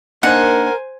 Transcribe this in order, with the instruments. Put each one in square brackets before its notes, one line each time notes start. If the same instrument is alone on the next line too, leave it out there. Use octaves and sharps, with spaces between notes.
[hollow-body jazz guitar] A#3 D4 D#4 [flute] A#4 [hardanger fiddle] C5 G#5 [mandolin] F#5